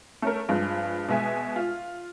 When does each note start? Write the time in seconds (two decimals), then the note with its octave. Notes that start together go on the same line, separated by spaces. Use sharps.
0.22 A3 C#4 A#4
0.49 G2 F3 G#3
1.08 B2 G#3 E5 G#5
1.56 F4